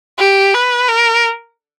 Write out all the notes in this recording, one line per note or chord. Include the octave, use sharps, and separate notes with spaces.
G4
B4
A#4